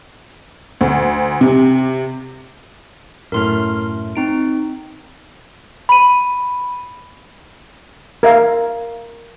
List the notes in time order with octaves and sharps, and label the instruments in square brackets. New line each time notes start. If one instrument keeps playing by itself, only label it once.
[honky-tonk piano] D2
C3
[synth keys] F#2 A2 A3 [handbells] A#4 C6 F6
[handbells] C4 D#4 D7
[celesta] B5 D#7
[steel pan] A#4 E5 F5